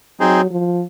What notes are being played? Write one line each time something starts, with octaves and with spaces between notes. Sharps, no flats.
F#3 C4 D#4 G#4 C5
F3